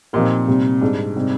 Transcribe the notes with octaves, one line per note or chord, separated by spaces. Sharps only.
A#2 F3 C4 D#4 G4 A#4
C3 G3 C4
G#2 G3 D4 G#4
C3 G3 C4 D#4